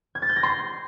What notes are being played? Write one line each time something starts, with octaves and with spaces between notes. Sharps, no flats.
G#6
A6
G6
A#6
C6